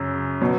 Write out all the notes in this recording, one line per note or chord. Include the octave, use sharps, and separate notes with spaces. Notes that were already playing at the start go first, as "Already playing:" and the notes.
Already playing: F#2 C#3
B2 F#3